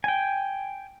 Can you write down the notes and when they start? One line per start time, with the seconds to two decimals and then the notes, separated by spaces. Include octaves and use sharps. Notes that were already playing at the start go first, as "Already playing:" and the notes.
0.04 G5 G#5